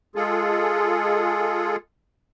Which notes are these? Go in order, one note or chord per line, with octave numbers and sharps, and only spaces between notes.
G#3 F4 G#4 A4